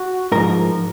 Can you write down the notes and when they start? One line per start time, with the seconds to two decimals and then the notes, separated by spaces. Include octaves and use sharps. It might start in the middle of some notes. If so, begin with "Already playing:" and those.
Already playing: F#4
0.32 G#2 F3 A#4